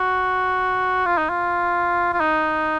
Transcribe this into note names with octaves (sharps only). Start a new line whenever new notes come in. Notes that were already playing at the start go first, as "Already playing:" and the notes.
Already playing: F#4
F4
D#4
F4
F4
D#4